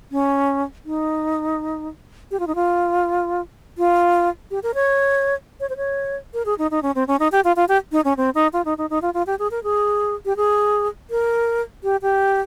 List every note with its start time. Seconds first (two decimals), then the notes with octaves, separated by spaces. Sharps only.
0.12 C#4
0.85 D#4
2.31 G4
2.40 F4
2.47 D#4
2.55 F4
3.78 F4
4.51 G4
4.63 A#4
4.75 C#5
5.60 C#5
5.69 C5
5.77 C#5
6.34 A#4
6.46 G#4
6.58 D#4
6.71 D#4
6.83 C#4
6.95 C4
7.08 C#4
7.19 D#4
7.32 G4
7.44 F4
7.56 F4
7.68 G4
7.92 D#4
8.05 C#4
8.17 C4
8.35 D#4
8.53 F4
8.65 D#4
8.78 D#4
8.90 D#4
9.02 F4
9.14 F4
9.27 G4
9.39 G#4
9.51 A#4
9.64 G#4
10.25 G4
10.36 G#4
11.10 A#4
11.84 G4
12.02 G4